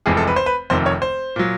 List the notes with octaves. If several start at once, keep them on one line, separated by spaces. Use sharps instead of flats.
F1 F2 C3 E3 G#3 G#4
A4
B4
C5
B4
F1 F2 C3 D#3 C5
C#5
C5
A#2 F#3